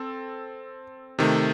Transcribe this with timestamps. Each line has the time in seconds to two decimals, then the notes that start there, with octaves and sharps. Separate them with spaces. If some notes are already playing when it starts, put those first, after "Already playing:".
Already playing: C4 A4
1.19 C3 D#3 A3